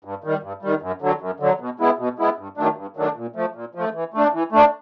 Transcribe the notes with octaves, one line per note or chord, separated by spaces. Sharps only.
G2
D#3 G3
G2
D#3 G3
F#2
D3 F#3
F#2
D3 F#3
B2
G#3 B3 E4
B2
G#3 B3 E4
G2
D#3 F#3 A3 D4
G2
D#3 F#3 A3 D4
A#2
F3 A3
A#2
F3 A3
E3
A3 D4
E3
A3 D4